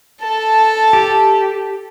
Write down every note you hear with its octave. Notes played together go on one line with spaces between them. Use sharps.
A4 A5
G4